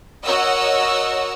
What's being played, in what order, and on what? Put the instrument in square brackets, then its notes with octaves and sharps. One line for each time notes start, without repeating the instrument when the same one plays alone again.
[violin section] F#4 A#4 C#5 D#5 F#5 E6